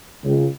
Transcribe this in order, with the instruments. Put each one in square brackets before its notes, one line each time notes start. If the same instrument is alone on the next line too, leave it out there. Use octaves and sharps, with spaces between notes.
[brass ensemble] C#2